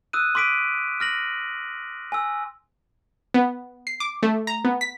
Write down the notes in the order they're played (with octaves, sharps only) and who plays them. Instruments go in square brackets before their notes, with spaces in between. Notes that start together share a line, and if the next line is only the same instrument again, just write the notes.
[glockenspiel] D#6 E6 F#6 D#7
C6 D6 B6 D7 D#7
F6 A#6 F#7
G#5 E6
[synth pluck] B3
C7
D6
A3
A#5
B3
B6